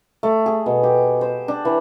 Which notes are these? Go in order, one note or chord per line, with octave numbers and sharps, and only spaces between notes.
A3
G#4
B2
G4
C5
D4
E3